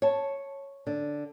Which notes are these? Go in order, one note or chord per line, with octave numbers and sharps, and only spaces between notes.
C#5 A5
D3